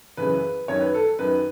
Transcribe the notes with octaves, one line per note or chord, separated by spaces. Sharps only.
F#2 C#3 E3 B4
F#2 D#3 C#5
B4
A4
F#2 D#3 B4